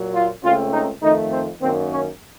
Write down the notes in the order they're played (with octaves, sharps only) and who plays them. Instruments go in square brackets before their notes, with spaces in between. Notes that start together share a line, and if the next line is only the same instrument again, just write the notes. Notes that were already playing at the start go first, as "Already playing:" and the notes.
Already playing: [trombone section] A#2 F#3 A#3
F4
C#2 C#3 A3 C4 F4
D#4
F2 D#3 A3 D#4
C4
F#2 D#3 A#3 C4
C#4